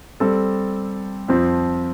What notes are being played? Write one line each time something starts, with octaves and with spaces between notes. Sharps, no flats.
G3 C4 A4
F2 F3 C4